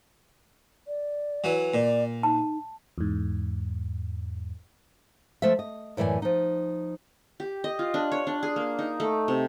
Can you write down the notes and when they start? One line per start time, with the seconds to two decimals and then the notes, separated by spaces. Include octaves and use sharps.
0.88 D5
1.44 E3 F#3
1.74 A#2 D5
2.23 D#4 A5
2.98 E2 G#2
5.42 F3 A3 C5 E5
5.59 D#5
5.97 F#2 A2 E3 D5 G#5
6.22 F3 D#4
7.40 G4
7.64 D#5
7.79 F4
7.94 D4
8.12 C#5
8.27 D4
8.43 G#4
8.56 A#3
8.79 D#4
9.00 A3
9.28 C3